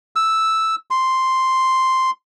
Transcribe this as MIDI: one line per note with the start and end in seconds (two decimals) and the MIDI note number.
0.16 0.75 88
0.91 2.10 84